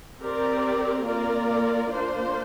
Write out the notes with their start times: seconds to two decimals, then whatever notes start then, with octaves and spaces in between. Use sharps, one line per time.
0.23 C4 G4 A#4 D5
1.07 A#3 F4 A#4 D5
1.91 A#3 D4 F4 C5